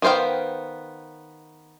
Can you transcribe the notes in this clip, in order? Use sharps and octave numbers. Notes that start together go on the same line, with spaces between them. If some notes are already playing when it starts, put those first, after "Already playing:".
D#3 B3 C5 F5 G5